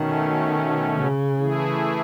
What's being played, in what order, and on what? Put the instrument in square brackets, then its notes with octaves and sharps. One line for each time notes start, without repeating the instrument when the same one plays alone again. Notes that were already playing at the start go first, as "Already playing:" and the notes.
Already playing: [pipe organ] B2 A3 C#4 [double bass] D#3
[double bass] C#3
[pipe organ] E3 A3 E4 G#4